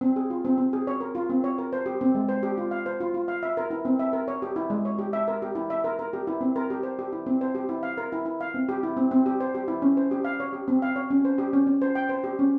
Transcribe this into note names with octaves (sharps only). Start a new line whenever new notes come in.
C4
G#4
F4
C4
C4
G#4
C#5
A#4
F4
C4
C#5
A#4
C5
G4
C4
G#3
C5
G4
F4
F5
C5
F4
F4
F5
E5
A#4
E4
C4
E5
A#4
C#5
G4
E4
G#3
C#5
G4
E5
A#4
G4
E4
E5
A#4
A#4
G4
E4
C4
A#4
G4
C5
G4
E4
C4
C5
G4
E4
F5
A#4
E4
E4
F5
C4
G4
E4
C4
C4
G4
C5
G4
E4
C#4
C5
G4
F5
C#5
G4
C4
F5
C#5
C#4
C5
G4
C#4
C#4
C5
G5
C5
G4
C#4